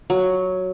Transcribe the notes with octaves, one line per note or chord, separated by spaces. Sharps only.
F#3